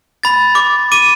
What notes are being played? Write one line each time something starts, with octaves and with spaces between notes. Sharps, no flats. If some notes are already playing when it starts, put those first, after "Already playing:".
B5 A6
D6
D6 D#7